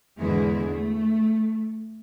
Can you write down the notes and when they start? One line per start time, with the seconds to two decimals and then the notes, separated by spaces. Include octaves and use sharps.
0.19 E2 G#2 D3 G#3 E4 G#4
0.72 A3